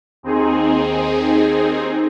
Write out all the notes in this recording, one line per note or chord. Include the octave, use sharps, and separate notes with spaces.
D#2 C4 D#4 G#4